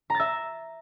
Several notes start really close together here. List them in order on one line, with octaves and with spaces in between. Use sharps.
A#5 A6 E5